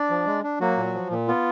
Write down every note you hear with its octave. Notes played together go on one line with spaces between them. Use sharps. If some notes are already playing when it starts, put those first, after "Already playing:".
Already playing: D4 D5
F3
G#3
D4
F#3 A#3 F#4
A#2
F3
A#2
B3 F4